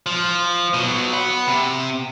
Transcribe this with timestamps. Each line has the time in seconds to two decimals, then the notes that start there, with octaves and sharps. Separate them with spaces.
0.06 F3
0.74 B2 F#3
1.13 F#5 B5
1.47 C3